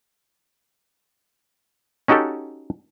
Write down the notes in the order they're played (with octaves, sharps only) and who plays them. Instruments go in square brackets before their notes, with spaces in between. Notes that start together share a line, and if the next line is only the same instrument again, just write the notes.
[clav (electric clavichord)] C#4 D#4 F#4 G4 A4